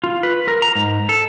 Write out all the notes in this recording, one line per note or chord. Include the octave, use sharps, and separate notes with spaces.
F4
B4
A#4
A#5
G#2
A4